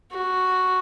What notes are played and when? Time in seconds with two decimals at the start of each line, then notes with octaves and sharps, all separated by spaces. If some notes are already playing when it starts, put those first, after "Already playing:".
0.12 F#4